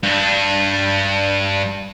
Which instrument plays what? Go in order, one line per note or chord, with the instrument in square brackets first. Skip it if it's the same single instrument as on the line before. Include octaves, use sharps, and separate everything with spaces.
[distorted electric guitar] G2 D4